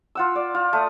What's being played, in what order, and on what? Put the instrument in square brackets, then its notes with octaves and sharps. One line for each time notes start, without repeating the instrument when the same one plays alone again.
[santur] F4 F#5 E6
D5
F4
A3 D#6